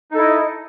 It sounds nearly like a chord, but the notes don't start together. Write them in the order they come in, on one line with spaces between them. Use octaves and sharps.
D#4 A4 E4 D#5